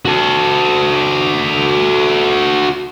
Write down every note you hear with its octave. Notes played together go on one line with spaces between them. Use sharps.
F#4 A4